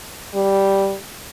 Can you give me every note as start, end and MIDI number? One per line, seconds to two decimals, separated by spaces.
0.34 0.96 55